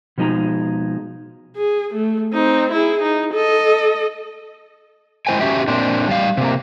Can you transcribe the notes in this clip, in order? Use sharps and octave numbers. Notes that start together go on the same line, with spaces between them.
B2 F3 G#3 D#4 G5 A#5
G#4
A3
C4 D#4
E4 G#4
D#4
A4 D#5
G#3 E4 C5 G5 G#5
C#4 F#4 G4 E5
A#2 C4 D4
G3 F5
C3 A#3